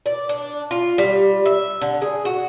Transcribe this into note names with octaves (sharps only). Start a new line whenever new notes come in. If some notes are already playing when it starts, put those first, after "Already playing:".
D5
D4
F4
G3
E5
D3
G#4
F#4